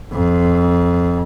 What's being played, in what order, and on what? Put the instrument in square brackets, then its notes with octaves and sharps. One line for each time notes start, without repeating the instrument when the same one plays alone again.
[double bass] F2